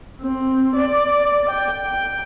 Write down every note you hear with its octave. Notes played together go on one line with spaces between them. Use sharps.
C4
D5
G5
G5